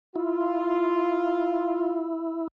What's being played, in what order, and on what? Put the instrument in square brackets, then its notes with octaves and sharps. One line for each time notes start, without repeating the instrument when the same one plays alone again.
[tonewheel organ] E4 [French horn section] F4